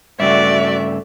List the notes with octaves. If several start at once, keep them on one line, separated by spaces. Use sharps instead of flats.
G2 C#3 A3 F#4 D5 E5